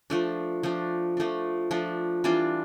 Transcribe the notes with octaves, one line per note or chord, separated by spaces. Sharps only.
F3 A3 D4
F3 A3 D4
F3 A3 D4
F3 A3 D4
E3 G3 D4 F4